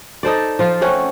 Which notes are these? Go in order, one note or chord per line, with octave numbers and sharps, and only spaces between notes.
D#4 A4 C5 D5
F3 F4 C5
A3 C4 C#4 F#5